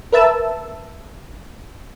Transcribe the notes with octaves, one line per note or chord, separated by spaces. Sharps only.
A#4 B4 E5 A5 E6